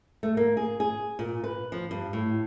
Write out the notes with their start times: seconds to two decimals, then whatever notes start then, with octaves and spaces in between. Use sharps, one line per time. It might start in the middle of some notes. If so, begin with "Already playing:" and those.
0.23 A3
0.37 A#3
0.57 G#4
0.80 G#4
1.19 A#2
1.44 B4
1.72 F3
1.91 G2
2.13 A2